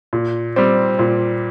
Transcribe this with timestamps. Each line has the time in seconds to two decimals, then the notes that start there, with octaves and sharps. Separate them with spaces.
0.13 A#2
0.56 G3 C4
0.99 A#2